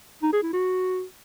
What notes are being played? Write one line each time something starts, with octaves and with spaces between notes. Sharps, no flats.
D#4
G#4
E4
F#4